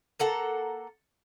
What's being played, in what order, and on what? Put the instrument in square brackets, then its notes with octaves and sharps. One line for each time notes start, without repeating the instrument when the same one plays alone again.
[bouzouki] A#3 A4 F#5 A#5